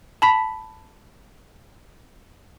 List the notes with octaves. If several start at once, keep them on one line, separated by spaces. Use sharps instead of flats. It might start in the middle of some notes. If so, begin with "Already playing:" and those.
A5 B5 B6